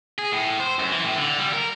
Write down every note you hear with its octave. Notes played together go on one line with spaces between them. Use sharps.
G#4
A2
C5
F#2
E3
A2
D3
G3
A#4